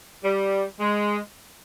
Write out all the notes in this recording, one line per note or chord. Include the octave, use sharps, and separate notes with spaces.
G3
G#3